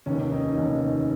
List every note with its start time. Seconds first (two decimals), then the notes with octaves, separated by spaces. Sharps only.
0.06 F1 D#2 D#3 C#4
0.30 D#4
0.54 F1 D#2 D#3 C#4